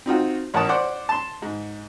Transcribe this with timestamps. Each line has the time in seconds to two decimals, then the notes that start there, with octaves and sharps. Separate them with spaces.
0.06 C4 D#4 F4 F#4
0.54 A1 A#4 F#5 A5 D#6
0.69 C5 D5 F#5
1.09 A5 C6
1.42 G#2